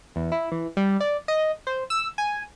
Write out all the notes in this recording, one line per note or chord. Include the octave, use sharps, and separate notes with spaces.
E2
E4
E3
G3
D5
D#5
C5
E6
G#5